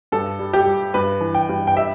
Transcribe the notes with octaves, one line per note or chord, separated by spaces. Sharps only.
G2 A4
G3
G4
G3
G2 B4
E3
G5
G2
G5
G3 E5